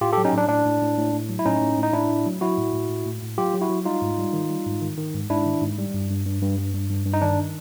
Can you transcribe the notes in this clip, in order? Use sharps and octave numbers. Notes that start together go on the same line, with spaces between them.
A2 F4 G4
G4 A4
F#3
C#4 D#4
A2 D4
A2 D4
A2
A2
A2
A2
F#3
E4
A2 C#4 D#4
A2
A2
D#4
A2 D4 E4
A2
F#3
F#3 E4 F#4
A2
A2
A2
A2
A2
F#3 F4 G4
F#3
E4 F#4
F#3
G3 D#4 F4
G#2
G3
D#3
G3
G#2
D#3
D#3
G#2
G#2 D4 E4
D#3
G#2
G3
G2
G2
G2
G2
G2
G2
G2
G2
D#4
D#3 D4